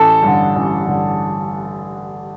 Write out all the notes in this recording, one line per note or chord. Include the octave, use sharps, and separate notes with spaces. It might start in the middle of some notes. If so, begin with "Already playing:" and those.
Already playing: A1 A4
G2 D3
A1
G2 D3